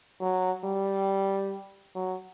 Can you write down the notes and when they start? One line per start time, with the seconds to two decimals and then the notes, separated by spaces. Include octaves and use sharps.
0.21 F#3
0.64 G3
1.95 F#3